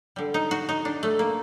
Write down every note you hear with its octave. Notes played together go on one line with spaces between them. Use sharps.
D3 G3
D#4
F#4
D#4
D4
A3
A#3